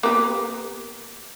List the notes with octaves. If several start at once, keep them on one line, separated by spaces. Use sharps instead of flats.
A#3 B3 G4